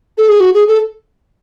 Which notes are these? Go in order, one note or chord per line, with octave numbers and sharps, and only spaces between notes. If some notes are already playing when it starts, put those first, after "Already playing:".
A4
G#4
F#4
G#4
A4